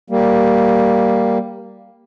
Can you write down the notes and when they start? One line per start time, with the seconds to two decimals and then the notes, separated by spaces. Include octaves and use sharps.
0.10 G3 A#3